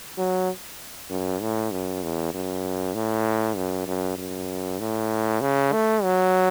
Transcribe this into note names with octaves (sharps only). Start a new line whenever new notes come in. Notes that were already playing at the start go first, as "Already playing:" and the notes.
F#3
F#2
A2
F#2
E2
F#2
A2
F#2
F#2
F#2
A2
C#3
A3
F#3